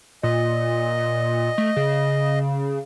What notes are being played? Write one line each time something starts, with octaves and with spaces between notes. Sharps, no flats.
A#2 D#5
A3
C#3